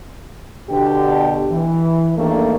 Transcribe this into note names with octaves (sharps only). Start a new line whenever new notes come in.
B2 D3 G4
E3
E2 G2 D#3 A3 A#3